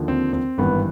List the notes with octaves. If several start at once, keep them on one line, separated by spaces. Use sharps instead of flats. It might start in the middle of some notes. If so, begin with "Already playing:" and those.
Already playing: D#2 D3 F3
C4
C4
G#1 G2 E3 B3